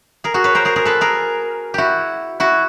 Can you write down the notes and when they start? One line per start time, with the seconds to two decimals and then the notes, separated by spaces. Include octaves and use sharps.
0.24 G#4 A#4
0.34 F#4 G#4
0.44 B4 C#5
0.55 A#4 C5
0.65 G#4 A#4
0.76 G#4 A#4
0.85 A4 B4
1.01 G#4 A#4
1.74 E4 F#4 G4
2.40 E4 F#4